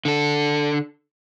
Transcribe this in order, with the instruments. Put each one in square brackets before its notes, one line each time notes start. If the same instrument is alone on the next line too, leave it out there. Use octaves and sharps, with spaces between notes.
[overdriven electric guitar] D3 A4